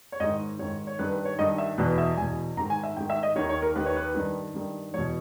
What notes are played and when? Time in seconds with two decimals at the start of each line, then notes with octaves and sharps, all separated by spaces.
0.12 C#5
0.20 G#2 D#3 D#5
0.59 G#2 D#3 C#5
0.87 C#5
0.99 G2 D#3 B4
1.12 B4
1.25 C#5
1.38 G2 D#3 D#5
1.58 E5
1.78 E2 B2 B4
1.98 E5
2.17 E2 B2 G#5
2.57 G#2 D#3 A#5
2.70 G#5
2.83 E5
2.97 G#2 G5
3.00 D#3
3.10 E5
3.23 D#5
3.36 D#3 C#5
3.39 D#2
3.49 C#5
3.62 A#4
3.76 D#2 D#3 B4
3.86 C#5
3.97 B4
4.15 G2 D#3
4.54 G2 D#3
4.94 E2 B2 C#5